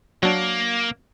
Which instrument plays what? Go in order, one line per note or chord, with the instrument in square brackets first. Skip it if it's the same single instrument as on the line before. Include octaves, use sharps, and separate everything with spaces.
[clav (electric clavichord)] F#3 D4 [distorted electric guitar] A#3